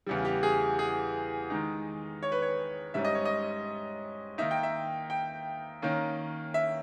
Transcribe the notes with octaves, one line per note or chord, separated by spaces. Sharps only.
E2 C#3 G3
G4
G#4
G#4
D#3 G#3 D#4
C#5
B4
C#5
G#2 G3 C#4 E5
D#5
C#5
D#5
D#3 A#3 D#4 E5
G5
E5
G5
D#3 A#3 C#4
E5